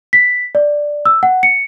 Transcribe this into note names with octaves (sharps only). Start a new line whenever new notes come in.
B6
D5
E6
F#5
C#7